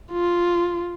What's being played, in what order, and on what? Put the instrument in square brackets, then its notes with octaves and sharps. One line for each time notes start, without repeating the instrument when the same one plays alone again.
[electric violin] F4